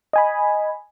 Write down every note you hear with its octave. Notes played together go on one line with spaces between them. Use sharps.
D#5 G#5 B5